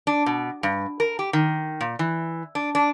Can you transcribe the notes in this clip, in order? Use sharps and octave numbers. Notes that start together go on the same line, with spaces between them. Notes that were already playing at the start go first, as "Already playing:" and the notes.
D4
B2
G2
A#4
G4
D#3
A#2
E3
D4
D4